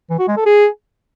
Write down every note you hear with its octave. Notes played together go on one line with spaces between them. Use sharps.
E3
F#4
G#3
A4
G#4